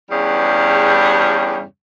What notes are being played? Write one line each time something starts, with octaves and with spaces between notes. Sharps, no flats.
E2 G2 C#3 G3